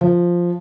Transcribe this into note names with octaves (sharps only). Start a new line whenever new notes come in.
F3